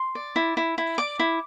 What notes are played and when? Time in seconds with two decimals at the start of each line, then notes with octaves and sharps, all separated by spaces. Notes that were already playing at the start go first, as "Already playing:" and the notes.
Already playing: C6
0.15 D5
0.36 E4
0.57 E4
0.78 E4
0.98 D5 D6
1.19 E4